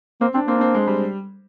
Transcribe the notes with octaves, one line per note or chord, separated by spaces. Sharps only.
A#3 C4
C4 D4
A#3 C4
D4
C4
G#3
G3